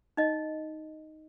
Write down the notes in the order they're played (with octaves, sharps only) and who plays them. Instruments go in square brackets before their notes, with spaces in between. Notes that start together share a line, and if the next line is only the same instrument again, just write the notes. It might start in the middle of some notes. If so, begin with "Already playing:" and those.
[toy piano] D#4 D#5